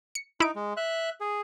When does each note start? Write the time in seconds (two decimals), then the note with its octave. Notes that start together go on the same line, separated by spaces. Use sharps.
0.15 C#7
0.40 D#4 E4 D7
0.55 G#3
0.77 E5 F#6
1.21 G#4